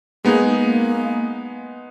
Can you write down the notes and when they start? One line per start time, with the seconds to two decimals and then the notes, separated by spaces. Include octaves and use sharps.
0.24 G#3 A#3 B3 D#4 G#4
0.59 A#3